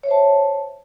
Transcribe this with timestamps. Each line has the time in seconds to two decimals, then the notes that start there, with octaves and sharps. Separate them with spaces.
0.03 C#5
0.06 E5
0.08 C5
0.11 A5